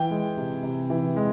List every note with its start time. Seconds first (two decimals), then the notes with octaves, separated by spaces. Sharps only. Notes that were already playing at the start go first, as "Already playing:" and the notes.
Already playing: E3 G5
0.11 G#3
0.37 C3
0.63 C3
0.90 E3
1.16 G#3